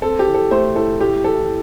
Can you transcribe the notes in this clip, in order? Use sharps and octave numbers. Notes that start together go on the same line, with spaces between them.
C4 A4
G4
E3
A4
A3 C5
A2 A4
A2 G4
E3 A4